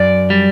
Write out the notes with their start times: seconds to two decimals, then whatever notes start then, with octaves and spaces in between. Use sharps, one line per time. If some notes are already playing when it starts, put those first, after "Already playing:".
Already playing: F#2 D5
0.30 G3